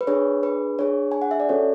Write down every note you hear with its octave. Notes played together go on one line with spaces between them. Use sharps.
B4
D4 G#4 C#5
B4
D4 G#4 C#5
G#5
F#5
E5
D5
C#4 F#4 A4 C#5